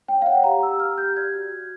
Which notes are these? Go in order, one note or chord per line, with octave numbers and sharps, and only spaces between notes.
C#5 G5
F5
C#5 F#5
G4 A#5
G4 E6
G4 F6
G4 G6
D5 G#6
F#4
F#4